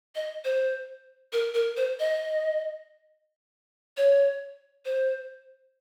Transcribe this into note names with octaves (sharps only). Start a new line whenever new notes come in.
D#5
C5
A#4
A#4
C5
D#5
C#5
C5